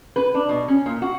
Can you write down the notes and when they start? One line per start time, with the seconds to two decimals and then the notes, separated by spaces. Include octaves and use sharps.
0.16 B4
0.34 D4
0.49 B2
0.68 C#4
0.86 A#2
1.02 F#4